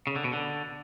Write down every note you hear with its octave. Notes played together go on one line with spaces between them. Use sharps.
C#3
D3
B2
D3